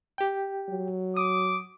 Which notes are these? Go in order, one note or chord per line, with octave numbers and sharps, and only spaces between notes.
G4 G5
F#3
D6 D#6